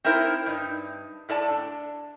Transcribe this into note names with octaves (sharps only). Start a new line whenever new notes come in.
C4 D#4 E4 A#4 C5
G2 D#4
A2 A4 D5 A5
D4